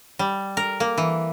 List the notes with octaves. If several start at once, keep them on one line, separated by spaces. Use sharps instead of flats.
G3
A#4
A#3
E3